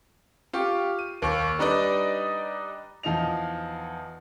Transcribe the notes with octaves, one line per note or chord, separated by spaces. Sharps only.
F4 G4 C#6
D#7
D#2 C#6
G3 D4 D#4 B4 D5 D#5
E2 F3 D#4 D#5 F7